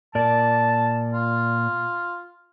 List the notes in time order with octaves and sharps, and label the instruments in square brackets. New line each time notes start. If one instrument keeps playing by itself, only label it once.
[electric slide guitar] A#2 A#4 D5 [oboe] A5
[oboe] F4